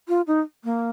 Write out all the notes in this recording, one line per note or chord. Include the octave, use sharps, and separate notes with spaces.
F4
D#4
A#3